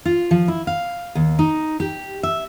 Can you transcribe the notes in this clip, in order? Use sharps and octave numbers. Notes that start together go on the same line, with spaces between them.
F4
F3
E4
F5
D#2
D#4
G4
E5